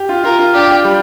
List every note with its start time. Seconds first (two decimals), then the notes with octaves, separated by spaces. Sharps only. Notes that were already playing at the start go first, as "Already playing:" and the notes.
Already playing: G4
0.09 F4
0.24 F4 A#4
0.39 F4
0.54 D4 G4
0.84 G3